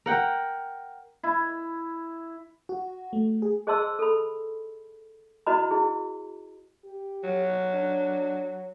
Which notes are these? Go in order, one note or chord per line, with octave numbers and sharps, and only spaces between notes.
A#4 F#5 G5
E4
F#4
A3
G#4
G#4 C5 D#5 A5 C6 E6
A4 B5
E4 F#4 B4 D#5 A#5 B5
E4 G#4
G4
F#3
D4